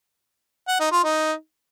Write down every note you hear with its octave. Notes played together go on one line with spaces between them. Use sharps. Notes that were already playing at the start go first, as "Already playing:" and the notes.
F#5
D#4
F4
D#4